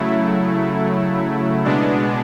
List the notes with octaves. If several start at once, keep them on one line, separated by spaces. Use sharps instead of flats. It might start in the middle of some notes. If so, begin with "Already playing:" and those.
Already playing: C#3 F#3 A3 E4
B2 G#3 B3 D4